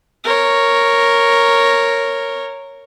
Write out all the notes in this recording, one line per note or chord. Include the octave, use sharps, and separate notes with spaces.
A#4 C#5